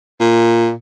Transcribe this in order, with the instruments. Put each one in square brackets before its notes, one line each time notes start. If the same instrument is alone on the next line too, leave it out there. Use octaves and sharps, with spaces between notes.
[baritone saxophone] A#2